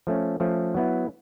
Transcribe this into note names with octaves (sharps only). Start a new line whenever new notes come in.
F3 A3 C#4
F3 A3 C#4
F#3 B3 E4